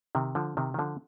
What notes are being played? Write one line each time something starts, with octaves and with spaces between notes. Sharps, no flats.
C3 D#3
D3 F3
C3 D#3
D#3
D3 F3